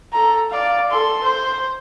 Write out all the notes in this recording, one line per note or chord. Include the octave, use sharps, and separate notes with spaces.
A4 A#5
D5 F5
A4 C6
C5